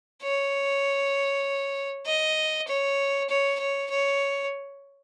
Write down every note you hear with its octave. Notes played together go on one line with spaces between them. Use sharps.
C#5
D#5
C#5
C#5
C#5
C#5